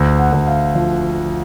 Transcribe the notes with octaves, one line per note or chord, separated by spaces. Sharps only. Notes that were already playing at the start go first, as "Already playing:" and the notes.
Already playing: D2
F#5
D2
F5
F3